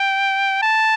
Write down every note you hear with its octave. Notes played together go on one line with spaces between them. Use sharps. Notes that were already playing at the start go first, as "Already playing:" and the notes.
Already playing: G5
A5